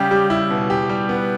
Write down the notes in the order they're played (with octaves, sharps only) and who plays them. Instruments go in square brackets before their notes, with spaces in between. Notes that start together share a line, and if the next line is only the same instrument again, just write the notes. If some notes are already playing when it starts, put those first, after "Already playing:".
Already playing: [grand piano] C#3 G3 [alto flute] G4
[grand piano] G3
E4
B2
G4
G3
[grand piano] B3 [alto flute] B4